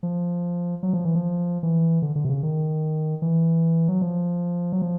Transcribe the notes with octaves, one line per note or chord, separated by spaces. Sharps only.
F3
F#3
F3
E3
F3
E3
D3
D3
C3
C#3
D#3
E3
F#3
F3
F#3
F3